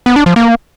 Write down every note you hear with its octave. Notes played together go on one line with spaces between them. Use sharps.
B3
D4
F3
A#3